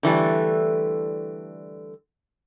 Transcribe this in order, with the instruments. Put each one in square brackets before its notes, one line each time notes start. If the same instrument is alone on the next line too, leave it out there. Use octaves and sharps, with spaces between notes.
[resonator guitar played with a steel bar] D3 E3 G3 A3